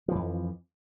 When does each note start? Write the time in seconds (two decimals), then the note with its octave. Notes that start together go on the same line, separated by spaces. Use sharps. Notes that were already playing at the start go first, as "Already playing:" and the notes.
0.08 F3
0.12 E3
0.15 F2